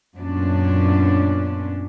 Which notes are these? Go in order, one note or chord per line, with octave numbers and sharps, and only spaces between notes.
F#2 A#2 B3 C#4 D4